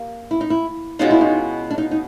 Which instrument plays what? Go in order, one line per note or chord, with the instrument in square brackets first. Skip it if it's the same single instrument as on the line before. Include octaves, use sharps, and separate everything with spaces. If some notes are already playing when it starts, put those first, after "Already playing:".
Already playing: [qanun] A#3 G4
[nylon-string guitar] E4
D#4
E4
[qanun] B2 G#3 C#4 F4 [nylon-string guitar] D#4
[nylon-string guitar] E4
D#4
D4
D#4
D#4